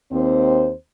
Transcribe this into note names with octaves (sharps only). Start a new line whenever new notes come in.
D#2 C4 C5